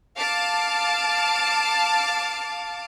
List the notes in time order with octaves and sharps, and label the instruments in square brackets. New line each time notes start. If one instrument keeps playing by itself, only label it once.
[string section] F5 A5 D6